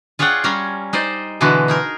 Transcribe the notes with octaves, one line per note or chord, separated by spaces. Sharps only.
F4 G#4 C#5 D5 F#5 G5
G3 C#4 G#5 A#5
D#4 C5 D5 D#5
B2 D3 E3 G#3 F#4
D#4 G#4 A#4